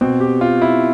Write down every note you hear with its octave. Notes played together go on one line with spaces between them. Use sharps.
B2 C4
G4
F4
E4